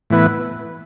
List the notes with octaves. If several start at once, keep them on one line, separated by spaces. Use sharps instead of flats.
A2 E3 B3 E4 B4